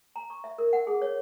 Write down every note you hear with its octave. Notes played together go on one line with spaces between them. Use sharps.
A#5
C#6
E5
A#4
F#5
G#4
C#5